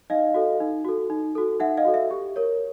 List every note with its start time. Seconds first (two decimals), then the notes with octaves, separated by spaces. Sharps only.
0.10 D#4 D#5 F5
0.34 F#4 A4
0.60 D#4
0.85 F#4 A4
1.10 D#4
1.35 F#4 A4
1.60 D#4 E5 F#5
1.77 D#5 F5
1.85 F#4 A4
1.94 E5
2.11 G4
2.36 A#4 C#5